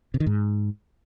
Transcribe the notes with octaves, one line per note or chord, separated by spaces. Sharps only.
C3
D#3
G#2